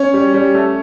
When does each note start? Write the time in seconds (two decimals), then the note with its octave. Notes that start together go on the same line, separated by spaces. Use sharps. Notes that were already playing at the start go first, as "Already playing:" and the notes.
Already playing: C#4 C#5
0.14 G3
0.34 G3
0.54 A3